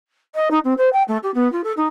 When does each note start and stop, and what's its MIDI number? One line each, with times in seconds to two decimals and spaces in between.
0.35 0.48 75
0.51 0.59 63
0.64 0.74 60
0.78 0.89 72
0.93 1.03 79
1.08 1.17 57
1.23 1.31 67
1.34 1.50 59
1.52 1.61 65
1.64 1.73 69
1.77 1.87 63